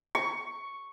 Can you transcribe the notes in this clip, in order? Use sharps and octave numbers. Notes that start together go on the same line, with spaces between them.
C#6